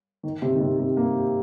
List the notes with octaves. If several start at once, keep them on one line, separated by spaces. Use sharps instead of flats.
D#3
C3
D#3
C3
C3
A#3
G4